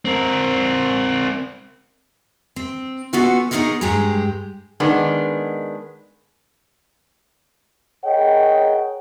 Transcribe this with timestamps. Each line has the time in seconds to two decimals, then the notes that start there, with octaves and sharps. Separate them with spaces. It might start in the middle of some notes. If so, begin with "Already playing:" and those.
0.05 C4 A#4
2.56 C4
3.13 B3 C#4 F4 F#4 A4 B4
3.51 B3 D#4 G#4 A#4 C#5 D#5
3.81 G2 G#3 G4 G#4 A#5
4.80 D#3 G#3 B3 D4
8.04 G#4 A#4 C#5 D#5 F#5 G5